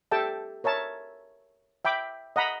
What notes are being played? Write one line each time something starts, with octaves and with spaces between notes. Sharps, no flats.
G4 A4 E5 G5 A5
A#4 C#5 E5 A5
E5 G5 B5 D6
D#5 F#5 A#5 B5